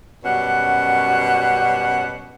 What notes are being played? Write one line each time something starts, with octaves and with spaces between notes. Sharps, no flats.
F#2 B2 G3 C#4 F#5